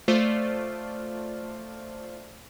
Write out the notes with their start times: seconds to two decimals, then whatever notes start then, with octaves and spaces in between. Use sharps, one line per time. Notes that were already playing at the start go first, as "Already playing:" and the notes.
0.08 A3 F4 C5 D5